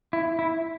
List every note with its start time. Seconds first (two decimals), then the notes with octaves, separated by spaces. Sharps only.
0.13 E4
0.39 E4